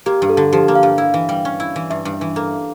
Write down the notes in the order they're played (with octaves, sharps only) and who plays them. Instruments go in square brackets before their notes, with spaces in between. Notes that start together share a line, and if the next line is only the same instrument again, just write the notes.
[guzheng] A#3 [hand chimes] G4
[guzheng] G2
[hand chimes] A4
[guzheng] D3
[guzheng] F3 [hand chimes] G4
[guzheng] A#3
[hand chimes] F5
[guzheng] G2
E4
E3
G3
C#4
E4
E3
[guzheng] G2 [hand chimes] E5
[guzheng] G2
[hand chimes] E5
[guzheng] E3
[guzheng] A#3 [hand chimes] A4